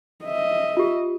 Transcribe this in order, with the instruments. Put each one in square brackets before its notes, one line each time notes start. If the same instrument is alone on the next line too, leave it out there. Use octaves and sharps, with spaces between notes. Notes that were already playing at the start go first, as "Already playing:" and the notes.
[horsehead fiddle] D#5 E5
[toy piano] F4 G4